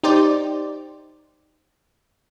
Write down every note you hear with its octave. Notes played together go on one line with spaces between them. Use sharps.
D#4 G4 C5 D5